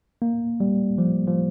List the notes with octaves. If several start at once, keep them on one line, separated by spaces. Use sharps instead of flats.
A#3
G3
F3
F3